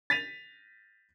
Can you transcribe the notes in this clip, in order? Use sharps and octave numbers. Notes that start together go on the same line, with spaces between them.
A6 B6 D#7 F7